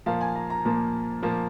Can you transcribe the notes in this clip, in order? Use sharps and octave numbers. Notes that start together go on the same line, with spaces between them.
A#2 F3 A#3 F5
G#5
A#5
A#5
A#2 F3 A#3
A#2 F3 A#3